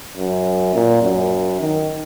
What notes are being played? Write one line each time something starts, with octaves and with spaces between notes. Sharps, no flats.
F#2
A#2
F#2
D#3